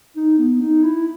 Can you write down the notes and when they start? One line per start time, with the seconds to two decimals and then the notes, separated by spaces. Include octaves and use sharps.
0.16 D#4
0.39 B3
0.61 D#4
0.84 E4